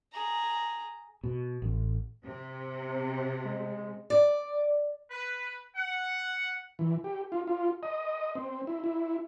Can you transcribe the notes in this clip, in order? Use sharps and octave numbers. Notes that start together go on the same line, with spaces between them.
G#4 A#5
B2
A1
C3
G#3
D5
B4
F#5
E3
G4
F4
F4
D#5
C4
E4
E4